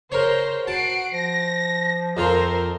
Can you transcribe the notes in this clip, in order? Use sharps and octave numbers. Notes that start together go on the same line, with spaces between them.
C#3 A#4 C5 C#5 A#5
F#4 F#5 A5 C7 D7
F3 A#6
F2 F4 A4 A#4 C5 A#5